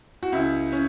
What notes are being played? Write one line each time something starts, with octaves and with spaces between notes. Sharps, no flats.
F#4
C#2 E4
C#4